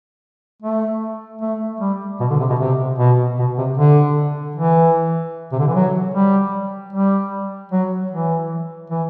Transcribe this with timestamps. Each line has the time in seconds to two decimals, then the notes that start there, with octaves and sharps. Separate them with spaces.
0.62 A3
1.42 A3
1.80 G3
2.20 B2
2.30 D3
2.40 C3
2.50 B2
2.59 C3
2.99 B2
3.39 B2
3.58 C3
3.78 D3
4.56 E3
5.52 C3
5.59 D3
5.67 E3
5.75 F#3
6.14 G3
6.93 G3
7.72 F#3
8.11 E3
8.90 E3